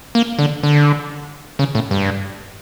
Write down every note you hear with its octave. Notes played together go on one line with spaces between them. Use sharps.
A#3
D3
D3
C#3
A2
G2